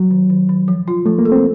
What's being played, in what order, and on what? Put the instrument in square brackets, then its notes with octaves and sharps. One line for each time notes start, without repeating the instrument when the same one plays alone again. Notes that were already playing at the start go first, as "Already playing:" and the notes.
Already playing: [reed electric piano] F#3
[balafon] D#3
D#3
D#3
F3
F4
[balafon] F3 [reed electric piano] A3
[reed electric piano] A#3
[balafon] A4
[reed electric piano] C4